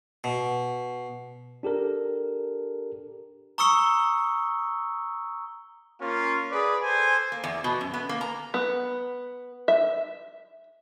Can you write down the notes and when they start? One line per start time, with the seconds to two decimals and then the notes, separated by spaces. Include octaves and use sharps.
0.24 B2
1.63 D4 G4 A4 A#4
3.58 A#5 C#6 D#6 E6 C#7 G7
6.01 A#3 C#4 F4
6.51 G#4 B4 D5
6.82 A4 C5 G#5
7.32 A#3
7.44 E2
7.64 B2
7.81 F#2
7.94 B3
8.09 A#3
8.21 A#5
8.54 B3
9.68 E5